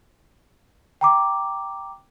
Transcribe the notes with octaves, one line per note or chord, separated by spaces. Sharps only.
G5 A#5 D6